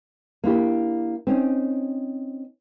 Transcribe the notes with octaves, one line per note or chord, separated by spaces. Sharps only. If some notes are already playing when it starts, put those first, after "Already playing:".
A#3 D4 E4 G4
C4 C#4 D#4